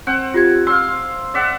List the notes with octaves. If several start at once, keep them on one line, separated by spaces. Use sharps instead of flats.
C4 F#5
F4 G4 G#6
F5 C6 E6
D5 E5 F#5